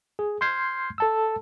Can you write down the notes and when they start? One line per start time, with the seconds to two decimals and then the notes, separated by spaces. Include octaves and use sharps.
0.19 G#4
0.41 C6 F6 G6 G#6 C7
0.98 A4 A5 E6